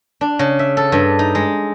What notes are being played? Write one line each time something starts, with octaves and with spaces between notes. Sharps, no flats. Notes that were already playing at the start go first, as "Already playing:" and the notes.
D4
C#3
E5
A4
G2
D#4
G#3